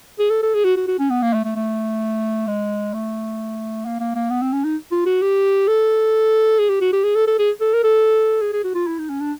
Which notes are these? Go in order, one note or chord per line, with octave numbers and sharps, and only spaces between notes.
G#4
A4
A4
G#4
F#4
F#4
F#4
C#4
B3
A#3
A3
A3
A3
G#3
A3
A#3
A#3
A#3
B3
C4
C#4
D#4
F4
F#4
G4
A4
G#4
G4
F#4
G4
G#4
A4
A4
G#4
A4
A#4
A4
G#4
G#4
F#4
F4
E4
D#4
C#4
D4